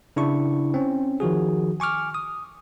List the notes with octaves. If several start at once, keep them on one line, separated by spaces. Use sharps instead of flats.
C#3 D4 E4 C#6
C4 C#4
D#3 F3 F#4 G#4
G#5 C#6 D6 F6
D#6